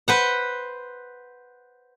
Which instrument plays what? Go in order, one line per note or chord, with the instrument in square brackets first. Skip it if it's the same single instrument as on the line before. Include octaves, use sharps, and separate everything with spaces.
[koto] B4 C5 F#5